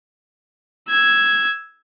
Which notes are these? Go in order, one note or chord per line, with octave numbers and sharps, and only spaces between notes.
E6 G#6